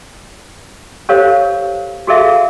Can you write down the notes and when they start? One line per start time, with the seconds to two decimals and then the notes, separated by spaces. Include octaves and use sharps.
1.09 G4 A4 C5 C#5 F5
2.07 F#4 G#4 A4 E5 F5